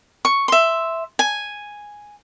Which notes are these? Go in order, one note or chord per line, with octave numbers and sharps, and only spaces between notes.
C#6
E5 C6
G#5